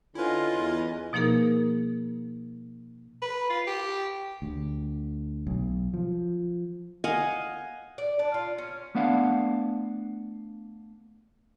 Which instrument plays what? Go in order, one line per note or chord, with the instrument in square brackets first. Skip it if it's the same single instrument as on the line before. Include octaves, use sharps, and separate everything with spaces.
[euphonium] D3 [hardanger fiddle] C#4 D#5 [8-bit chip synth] E4 B4 [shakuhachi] F4
[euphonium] E2
[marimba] B2 F3 A#3 D#4 G#4 A#4
[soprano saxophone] B4
F4
G4
[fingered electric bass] D2
B1
F3
[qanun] D#5 F5 F#5 G#5
[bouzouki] D5
D4
F4
C#4
[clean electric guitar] A3 B3 D4 D5 F5 F#5